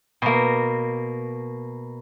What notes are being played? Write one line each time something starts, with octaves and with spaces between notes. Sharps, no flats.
B2 A#3